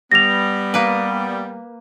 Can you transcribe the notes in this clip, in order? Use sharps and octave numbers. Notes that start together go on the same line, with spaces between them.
G3 B3 A#6 F7
A#3 B4